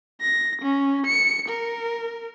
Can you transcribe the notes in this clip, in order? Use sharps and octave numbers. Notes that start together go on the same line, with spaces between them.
A#6
C#4
C#7
A#4